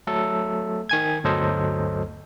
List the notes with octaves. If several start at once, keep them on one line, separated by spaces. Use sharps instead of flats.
F#3 A3 A4
D#3 G#5 G#6
G1 D2 F#3 A4 C5 D#5